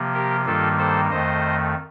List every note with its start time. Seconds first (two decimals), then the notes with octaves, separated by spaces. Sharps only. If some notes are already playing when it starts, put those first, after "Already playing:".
Already playing: C3 F3 A#3
0.14 G4 A#4
0.45 G2 D#3 G3 A#3 F4 A4
0.78 A4 C5
1.10 F2 D#3 A3 C5 D#5